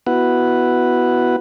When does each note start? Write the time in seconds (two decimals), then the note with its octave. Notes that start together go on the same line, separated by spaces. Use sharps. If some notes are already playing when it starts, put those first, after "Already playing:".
0.07 B3 E4 F#4 B4 F#5